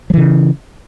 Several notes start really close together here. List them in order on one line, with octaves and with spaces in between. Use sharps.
F#3 E3 C#3